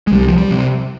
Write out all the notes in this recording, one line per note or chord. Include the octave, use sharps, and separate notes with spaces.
G#3
C2 G3
F3
G3
C3